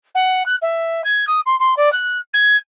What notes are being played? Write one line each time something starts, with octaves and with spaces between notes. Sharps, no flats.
F#5
F#6
E5
G#6
D#6
C6
C6
D5
F#6
G#6